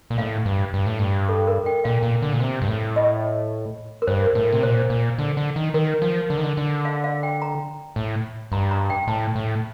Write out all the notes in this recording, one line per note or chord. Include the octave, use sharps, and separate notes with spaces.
A#2
A2 F5
G2
G2
A2
G2
A4
A#4
G5
A#2 F5
A#2
D3
A#2
C3
G2
A2
D#5
A#4
G2 C5
A#4
A2
C3
A#2 C5
A#2
D3
D3
D#3
D#3 A#4
F3
D3
D#3
D3
D3
F5
F5
G5
A#5
A2
G2 A#5
A#5
G5
A2 A5
A2